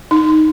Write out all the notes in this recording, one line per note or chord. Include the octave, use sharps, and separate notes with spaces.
D#4